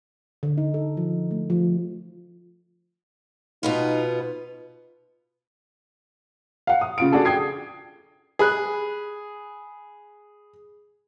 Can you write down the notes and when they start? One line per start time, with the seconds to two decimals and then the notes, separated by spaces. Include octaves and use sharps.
0.43 D3
0.58 D#4
0.74 A4
0.97 F3
1.31 A3
1.50 F3
3.63 B2 B3 D#4 F4
6.67 F5 F#5
6.81 D#6
6.98 C#3 F4 D7
7.12 D4 F#4 G#4 A4
7.25 G5 D#6 G#6 C7
8.39 G#4 B5 F#6